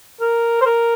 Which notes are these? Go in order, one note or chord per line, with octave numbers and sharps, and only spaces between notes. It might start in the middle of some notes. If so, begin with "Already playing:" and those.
A#4
C5
A#4